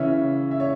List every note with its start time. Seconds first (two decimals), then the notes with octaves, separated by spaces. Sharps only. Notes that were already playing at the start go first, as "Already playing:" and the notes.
Already playing: C#3 E3 C#4 E5
0.51 E5
0.60 C#5